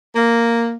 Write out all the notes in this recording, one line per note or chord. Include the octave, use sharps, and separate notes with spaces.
A#3